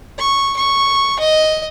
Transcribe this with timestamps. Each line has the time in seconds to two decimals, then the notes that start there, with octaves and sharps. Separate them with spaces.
0.18 C#6
0.56 C#6
1.19 D#5